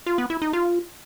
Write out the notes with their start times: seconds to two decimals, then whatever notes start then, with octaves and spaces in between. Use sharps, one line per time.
0.06 F4
0.18 B3
0.30 E4
0.42 D#4
0.53 F4